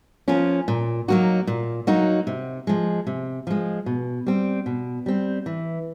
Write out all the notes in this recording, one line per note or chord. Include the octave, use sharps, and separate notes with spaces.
F3 A#3 C#4 F4
A#2
F#3 A#3 D#4 F#4
A#2
F#3 A#3 D#4 F#4
C3
F3 G#3
C3
F3 G#3
B2
G3 C4
B2
G3 C4
E3